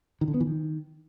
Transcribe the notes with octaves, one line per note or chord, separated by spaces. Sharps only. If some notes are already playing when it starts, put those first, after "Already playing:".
D#3
D3
B3
E3
D#3